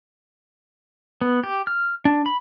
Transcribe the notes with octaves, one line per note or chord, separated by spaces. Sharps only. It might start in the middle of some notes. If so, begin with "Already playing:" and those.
B3
G4
F6
D4
B5